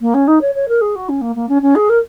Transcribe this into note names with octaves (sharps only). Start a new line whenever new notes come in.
A#3
C#4
D#4
C#5
C#5
A#4
G#4
F#4
C#4
A#3
A#3
C#4
C#4
G#4
A#4